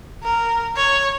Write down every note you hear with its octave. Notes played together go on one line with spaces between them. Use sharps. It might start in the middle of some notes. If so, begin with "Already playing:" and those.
A#4
C#5